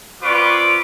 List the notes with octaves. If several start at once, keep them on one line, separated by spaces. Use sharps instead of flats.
C4 F4 B4 D5 C#6 D6